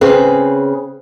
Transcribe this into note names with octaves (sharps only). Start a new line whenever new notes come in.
C#3 C4 G#4 B4